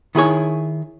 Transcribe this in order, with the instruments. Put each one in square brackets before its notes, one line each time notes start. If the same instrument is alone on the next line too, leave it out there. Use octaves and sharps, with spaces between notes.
[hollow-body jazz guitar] D#3 E4 G#4 C#5